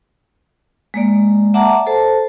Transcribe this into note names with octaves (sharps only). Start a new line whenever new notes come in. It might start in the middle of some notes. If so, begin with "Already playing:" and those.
G#3 A#3 D5
D5 E5 F#5 A5 A#5 D6
A4 C5 A5